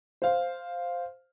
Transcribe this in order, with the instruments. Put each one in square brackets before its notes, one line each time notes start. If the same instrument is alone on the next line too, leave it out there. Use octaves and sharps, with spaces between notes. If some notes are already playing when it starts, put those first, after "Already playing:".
[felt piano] C5 F5